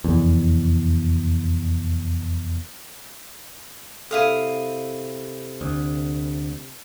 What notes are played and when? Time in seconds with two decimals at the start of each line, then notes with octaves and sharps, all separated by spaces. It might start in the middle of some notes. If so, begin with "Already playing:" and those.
0.04 F1 E2
4.11 C3 E4 A4 F5 D#6 D#7
5.61 D2